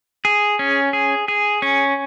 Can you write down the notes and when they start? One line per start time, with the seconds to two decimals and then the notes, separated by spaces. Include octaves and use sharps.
0.25 G#4
0.59 C#4
0.93 G#4
1.28 G#4
1.62 C#4